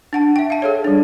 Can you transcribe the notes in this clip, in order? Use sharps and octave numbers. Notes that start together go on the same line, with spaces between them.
D4 F#5 A5
E5 G5
F5 A5
G#4 A4 C#5
G3 D4